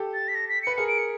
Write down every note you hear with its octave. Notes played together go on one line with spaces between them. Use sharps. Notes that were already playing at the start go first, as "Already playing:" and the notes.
Already playing: G4 A4
A6
B6
A#6
B6
B4 C#7
G#4 A#4 C#7
D7
C#7